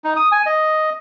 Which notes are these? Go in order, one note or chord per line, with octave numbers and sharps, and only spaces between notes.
D#4
D#6
G#5
D#5